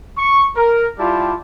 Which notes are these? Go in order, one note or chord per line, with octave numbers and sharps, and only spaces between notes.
C#6
A#4
G3 E4 F4 G4 D5 A5